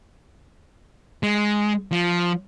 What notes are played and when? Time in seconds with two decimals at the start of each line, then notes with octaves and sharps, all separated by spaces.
1.23 G#3
1.92 F3